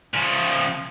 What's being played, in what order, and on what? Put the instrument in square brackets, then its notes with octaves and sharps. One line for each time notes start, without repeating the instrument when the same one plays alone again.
[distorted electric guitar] C#3 F3